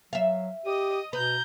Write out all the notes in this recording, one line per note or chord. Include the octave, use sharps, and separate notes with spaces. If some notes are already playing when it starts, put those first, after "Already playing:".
F#3 E5 F5
G4 D#5 D#6
B2 B4 A#5 G6